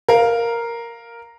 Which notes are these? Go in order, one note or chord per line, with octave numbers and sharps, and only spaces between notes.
A#4 F5